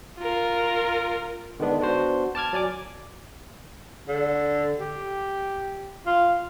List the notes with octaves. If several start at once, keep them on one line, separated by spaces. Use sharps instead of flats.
F4 A#4
D3 D#3 G#3 B3 D4
B3 D4 F#4 C5
A5 D6 F6 G#6
F#3 D5 G#5 D6
D3
G4
F4